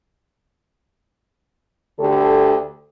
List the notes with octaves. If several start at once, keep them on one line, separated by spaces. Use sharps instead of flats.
D2 D3 G4 A4